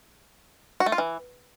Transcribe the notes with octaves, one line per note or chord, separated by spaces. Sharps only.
F#4
A3
F4
E3